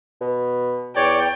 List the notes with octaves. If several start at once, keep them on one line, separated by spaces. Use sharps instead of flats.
B2
E2 C#5 D5 G5